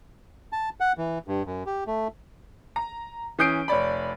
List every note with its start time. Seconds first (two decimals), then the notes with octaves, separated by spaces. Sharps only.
0.52 A5
0.80 F#5
0.98 E3
1.28 G2
1.46 F#2
1.66 G4
1.87 A3
2.76 A#5
3.39 E3 C#4 D#6 G6 C7 D7
3.68 F1 C#5 D5 B5